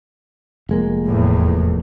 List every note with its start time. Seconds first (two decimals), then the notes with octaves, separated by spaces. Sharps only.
0.69 F1 G#3 A#3
1.07 E2 A2